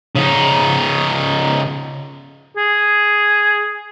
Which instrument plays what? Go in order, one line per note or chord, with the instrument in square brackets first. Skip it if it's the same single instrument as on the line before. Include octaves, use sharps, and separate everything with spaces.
[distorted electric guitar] C#3 D#4
[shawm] G#4